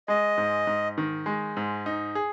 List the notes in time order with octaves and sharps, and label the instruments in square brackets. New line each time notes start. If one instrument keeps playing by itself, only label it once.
[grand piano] G#3 [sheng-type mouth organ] D#5
[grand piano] G#2
G#2
D#3
G#3
G#2
D#4
G#4